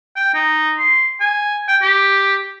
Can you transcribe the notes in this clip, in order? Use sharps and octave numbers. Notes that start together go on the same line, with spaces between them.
G5
D#4
C6
G#5
G5
G4